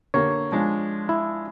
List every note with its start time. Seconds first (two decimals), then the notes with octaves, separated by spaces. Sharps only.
0.14 D3 A#3 G4 C#5
0.52 F3 G#3 D4
1.09 E4